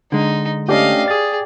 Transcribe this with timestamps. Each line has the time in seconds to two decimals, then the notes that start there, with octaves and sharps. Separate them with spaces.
0.12 D3 G#3 D#4
0.68 A3 C#4 D4 G4 D5 D#5 F5
1.08 G#4 D#6 A6